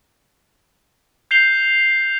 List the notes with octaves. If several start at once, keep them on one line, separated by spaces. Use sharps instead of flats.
G6 C7 F7 G7